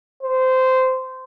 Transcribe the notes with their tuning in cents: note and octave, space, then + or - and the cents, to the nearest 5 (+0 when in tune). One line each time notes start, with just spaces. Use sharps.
C5 -15